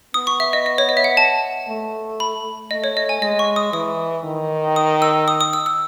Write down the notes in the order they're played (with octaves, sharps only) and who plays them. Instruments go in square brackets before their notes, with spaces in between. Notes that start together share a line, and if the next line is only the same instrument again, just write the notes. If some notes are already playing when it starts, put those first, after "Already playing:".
[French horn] B3 [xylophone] D#6
[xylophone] C#6
E5
D#5
D#5
C#5
D#5
E5
F#5
A5
[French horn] A3
[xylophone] B5
[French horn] A3 [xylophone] D#5
[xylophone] C#5
D#5
G#5
[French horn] G#3 [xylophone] D#5
[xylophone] C#6
D#6
[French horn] E3 [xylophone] D#6
[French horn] D#3
[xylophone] D#6
E6
D#6
D#6
E6
E6